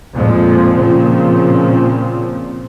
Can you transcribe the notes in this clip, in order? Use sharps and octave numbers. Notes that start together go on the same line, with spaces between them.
F2 A#2 F3 G#3
A#2 C#3 F3 C4